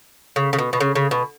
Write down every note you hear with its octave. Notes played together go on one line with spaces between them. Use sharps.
C#3
C#3
B2
B2
C#3
C#3
B2